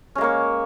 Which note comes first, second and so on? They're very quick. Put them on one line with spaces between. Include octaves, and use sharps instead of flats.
C#4 G#3 A#3 C#5